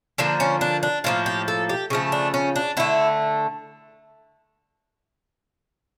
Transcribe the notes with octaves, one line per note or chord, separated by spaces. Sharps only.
D3 F3 A#3 D4
C#4
D4
D4
A2 F3 A#3 F4
G4
A4
G4
C#3 F3 A3
D4
C#4
D4
D3 A3 E4